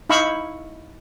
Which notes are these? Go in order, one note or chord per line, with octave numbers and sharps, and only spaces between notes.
D#4 E4 F5 B5 C#6 E6